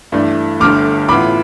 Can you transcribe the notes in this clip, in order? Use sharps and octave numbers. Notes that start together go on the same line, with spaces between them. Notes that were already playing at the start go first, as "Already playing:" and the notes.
G2 E3 A3 D4
G1 G2 D3 A3 D6 F6
A1 A2 E3 B3 F4 B5 D6